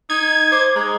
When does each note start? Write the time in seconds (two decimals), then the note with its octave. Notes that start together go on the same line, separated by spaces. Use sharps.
0.10 D#4 G#6
0.52 C5 D6
0.76 G#3 A#5